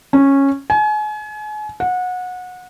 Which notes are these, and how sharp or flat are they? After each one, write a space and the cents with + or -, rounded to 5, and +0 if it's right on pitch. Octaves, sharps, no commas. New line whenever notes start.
C#4 -10
G#5 +35
F#5 -25